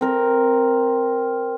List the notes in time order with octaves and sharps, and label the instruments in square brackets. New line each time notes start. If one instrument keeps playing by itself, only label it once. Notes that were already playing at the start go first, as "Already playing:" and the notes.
[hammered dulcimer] C4 A#4